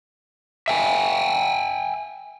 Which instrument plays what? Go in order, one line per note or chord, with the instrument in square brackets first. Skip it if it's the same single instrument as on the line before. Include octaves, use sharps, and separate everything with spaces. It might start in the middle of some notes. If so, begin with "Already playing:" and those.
[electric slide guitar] E5 G5 G#5